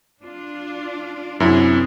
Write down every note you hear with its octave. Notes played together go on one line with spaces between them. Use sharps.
D4 F4
F#2 C3 D4 E4 G#4